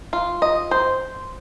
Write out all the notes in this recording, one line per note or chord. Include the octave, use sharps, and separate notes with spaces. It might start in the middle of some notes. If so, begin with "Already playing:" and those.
F4
D#5
C5